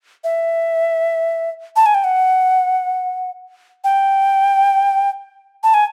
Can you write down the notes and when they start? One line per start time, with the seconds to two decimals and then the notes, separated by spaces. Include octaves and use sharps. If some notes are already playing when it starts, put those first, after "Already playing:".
0.24 E5
1.76 A5
1.86 G#5
1.94 G5
2.04 F#5
3.84 G5
5.63 A5
5.74 G#5